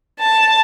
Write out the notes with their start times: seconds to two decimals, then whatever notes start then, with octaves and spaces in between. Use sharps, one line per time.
0.20 A5